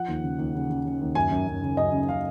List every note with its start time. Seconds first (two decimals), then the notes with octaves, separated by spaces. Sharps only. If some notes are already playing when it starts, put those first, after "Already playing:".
Already playing: F3 F#5
0.08 D#2
0.23 C#3
0.39 D#2
0.55 C#3
0.70 C#3
0.86 C#3
1.01 D#2
1.15 F#2 G#5
1.31 F#2
1.47 F#2
1.62 C#3
1.77 F#2 D#5
1.92 C#3
2.08 C#3 F5